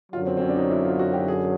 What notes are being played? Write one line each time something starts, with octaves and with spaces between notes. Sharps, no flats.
F#2 D3 F#3 F4
C4
C4
C#4
D4
D#4
E4
F4
F#4
G4
G#4